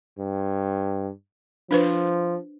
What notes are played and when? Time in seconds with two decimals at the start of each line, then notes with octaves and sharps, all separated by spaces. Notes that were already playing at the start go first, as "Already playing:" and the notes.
0.18 G2
1.71 F3 D4 B4 C5